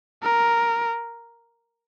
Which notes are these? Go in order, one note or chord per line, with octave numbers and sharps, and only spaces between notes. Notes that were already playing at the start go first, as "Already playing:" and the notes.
A#4